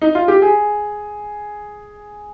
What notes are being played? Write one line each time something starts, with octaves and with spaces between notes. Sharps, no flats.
D#4
F4
G4
G#4